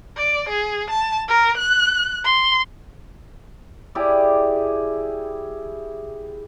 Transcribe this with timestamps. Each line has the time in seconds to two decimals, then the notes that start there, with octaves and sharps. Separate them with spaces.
0.17 D5
0.49 G#4
0.90 A5
1.28 A#4
1.58 F#6
2.24 C6
3.95 E4 G4 G#4 D5